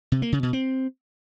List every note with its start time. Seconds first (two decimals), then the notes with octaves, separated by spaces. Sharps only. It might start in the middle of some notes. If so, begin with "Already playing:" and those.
0.12 C3
0.22 A#3
0.32 C#3
0.43 B2
0.53 C4